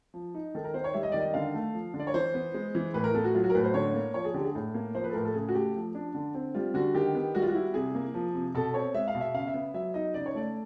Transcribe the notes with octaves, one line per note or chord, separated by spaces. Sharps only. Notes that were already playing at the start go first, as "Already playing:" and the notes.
F3
D#4
D#3 A4
A#4
B3 C5
C#5
G3 E5
D#5
D#3 D5
D#5
D3 F5
A3
F3
D3
D5
C#5
E3 C5
B3
G#3
E3
A2 B4
A#4
B3 A4
F#4
F#3 F4
F#4
A#4
A2 B4
C5
D3 C#5
A#3
F3 C#5
G#4
D3 G4
G#4
A2
A#3
F3 C5
B4
A4
A2 A#4
A4
C#3 G#4
F#4
A3 G4
F3
D4
D3
C4
G3 F4
D3 F#4
D#3 G4
B3
G3 F#4
F4
F#4
E4
C3 G#4
A#3
F3
C3
B2 A4
C4 C#5
G#3 E5
F5
B2
E5
C#3 F5
E5
B3
F#3 E5
D#4 D#5
C#3 D5
C#5
A3 D5